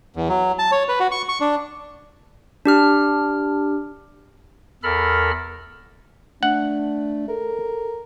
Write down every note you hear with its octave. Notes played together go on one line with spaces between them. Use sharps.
E2
F#3
A5
C#5
B4
F#4
C#6
C#6
D4
D4 G4 F6
E2 A4 A#4 B5 F6
A3 D4 F#5
A4 A#4